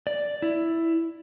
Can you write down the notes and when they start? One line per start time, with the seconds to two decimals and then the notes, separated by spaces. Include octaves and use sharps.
0.07 D5
0.42 E4